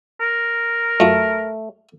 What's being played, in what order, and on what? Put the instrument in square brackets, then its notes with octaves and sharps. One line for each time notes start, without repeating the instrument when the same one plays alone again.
[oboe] A#4
[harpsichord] F#2 F4 [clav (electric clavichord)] A3